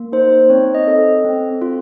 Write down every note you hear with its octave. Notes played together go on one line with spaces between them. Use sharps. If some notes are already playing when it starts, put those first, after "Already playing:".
Already playing: A#3
D#4 C5
C4 C#5
D#5
A4
C4
F4